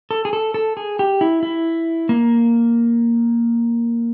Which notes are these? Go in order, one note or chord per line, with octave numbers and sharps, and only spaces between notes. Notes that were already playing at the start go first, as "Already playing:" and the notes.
A4
G#4
A4
A4
G#4
G4
E4
E4
A#3